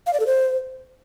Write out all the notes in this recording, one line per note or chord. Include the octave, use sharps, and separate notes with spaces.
F5
D5
A4
C5